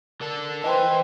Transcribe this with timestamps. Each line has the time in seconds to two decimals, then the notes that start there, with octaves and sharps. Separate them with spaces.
0.21 D3 A4 A#4
0.64 E3 B4 C5 D#5 G5